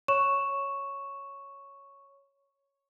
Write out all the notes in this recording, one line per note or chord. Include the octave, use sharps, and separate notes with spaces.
C#5 C#6 E7